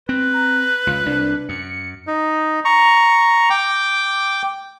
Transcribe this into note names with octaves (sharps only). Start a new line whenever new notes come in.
C4 B4
A#5
C#2 F4
C2 D4
F#2 C#7
D#4
A#5 C#6
G5 D6